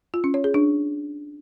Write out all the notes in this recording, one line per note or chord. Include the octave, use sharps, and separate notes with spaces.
F4
C#4
C#5
G#4
D4